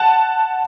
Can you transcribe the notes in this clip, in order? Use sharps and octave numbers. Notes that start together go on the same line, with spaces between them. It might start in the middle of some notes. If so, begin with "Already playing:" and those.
Already playing: F#5 A5